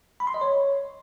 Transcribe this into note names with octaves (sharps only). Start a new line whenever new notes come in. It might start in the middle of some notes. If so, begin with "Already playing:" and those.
B5
C6
D#5
C#5